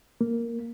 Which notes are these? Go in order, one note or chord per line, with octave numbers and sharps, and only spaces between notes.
A#3